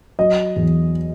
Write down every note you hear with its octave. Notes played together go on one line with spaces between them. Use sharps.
F#3 D#5
E2